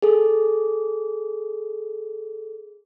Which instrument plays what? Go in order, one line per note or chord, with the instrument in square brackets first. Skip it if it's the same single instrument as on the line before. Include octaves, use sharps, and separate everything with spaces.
[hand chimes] G#4 A4